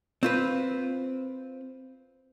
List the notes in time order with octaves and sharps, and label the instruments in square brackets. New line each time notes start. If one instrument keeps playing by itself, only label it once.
[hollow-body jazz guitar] C4 F4 B4